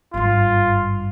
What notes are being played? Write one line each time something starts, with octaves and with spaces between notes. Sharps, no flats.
G#1 G2 F4